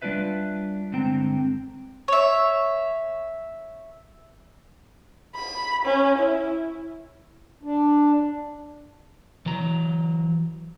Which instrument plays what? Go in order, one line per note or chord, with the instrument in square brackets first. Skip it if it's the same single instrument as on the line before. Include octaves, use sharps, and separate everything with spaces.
[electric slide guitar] G3 C4 D4 F4 B4 E5
G2 D3 G#3 C4 G5 A#5
[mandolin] C#5 E5
[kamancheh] B5
C#4
E4
[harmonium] D4
[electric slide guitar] E3 F#3 A#5